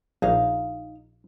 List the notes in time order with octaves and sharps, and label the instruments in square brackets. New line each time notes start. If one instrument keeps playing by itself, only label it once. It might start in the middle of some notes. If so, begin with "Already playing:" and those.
[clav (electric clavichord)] A#1 [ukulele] D#4 F5